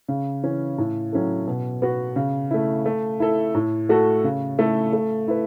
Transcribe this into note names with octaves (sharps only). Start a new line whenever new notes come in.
C#3
E3 C#4
A2
F#3 C#4 E4 A4
B2
B3 F#4
C#3
A3 E4
A3
E4 A4
A2
A3 F#4 A4
C#3
A3 E4 A4
A3
E4 B4